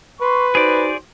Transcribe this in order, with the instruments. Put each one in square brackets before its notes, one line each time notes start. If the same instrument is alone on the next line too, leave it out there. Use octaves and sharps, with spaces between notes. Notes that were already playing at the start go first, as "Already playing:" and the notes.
[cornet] B4 [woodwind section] C6 C#6
[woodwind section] D#4 F#4 C5 [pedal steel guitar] G#4 D5